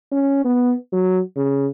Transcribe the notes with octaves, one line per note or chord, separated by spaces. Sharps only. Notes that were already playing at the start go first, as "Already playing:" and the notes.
C#4
B3
F#3
C#3